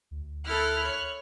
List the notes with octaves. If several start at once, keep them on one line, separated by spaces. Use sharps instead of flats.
D2
E4 A4 F6 F#6
C#5